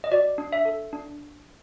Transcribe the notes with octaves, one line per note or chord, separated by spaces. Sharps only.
D#5
F#4 D5
D4
E5
A4
D4